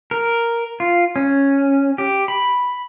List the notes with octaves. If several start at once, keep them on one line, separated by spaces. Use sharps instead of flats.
A#4
F4
C#4
G4
B5